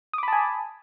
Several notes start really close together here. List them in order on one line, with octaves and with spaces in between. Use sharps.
D#6 D6 B5 A5 G#5